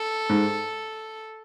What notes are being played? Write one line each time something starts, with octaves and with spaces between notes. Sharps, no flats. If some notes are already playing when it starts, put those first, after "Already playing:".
Already playing: A4
G#2